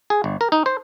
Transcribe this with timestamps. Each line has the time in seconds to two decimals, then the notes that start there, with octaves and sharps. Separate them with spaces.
0.10 G#4
0.24 G1
0.41 A#4
0.52 D#4
0.66 C5